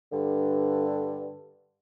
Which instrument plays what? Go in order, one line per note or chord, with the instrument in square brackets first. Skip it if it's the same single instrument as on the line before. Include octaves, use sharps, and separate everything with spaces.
[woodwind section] G2 D3